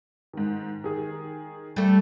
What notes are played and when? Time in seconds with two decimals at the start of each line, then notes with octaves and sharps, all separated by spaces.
0.33 G#2 D#3
0.84 D#3 G#4
1.76 G3 A3